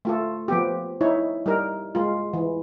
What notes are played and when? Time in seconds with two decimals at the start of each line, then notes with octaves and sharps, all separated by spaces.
0.05 A3 F4 A4
0.48 F3 B3 G4
1.01 D#4 E4 C#5
1.46 G3 D#4 A#4
1.95 G#3 F4
2.33 E3